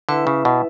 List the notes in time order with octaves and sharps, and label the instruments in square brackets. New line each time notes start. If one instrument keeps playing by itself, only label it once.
[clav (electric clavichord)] D3 [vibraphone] E4 B4 E5
[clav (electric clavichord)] C#3
B2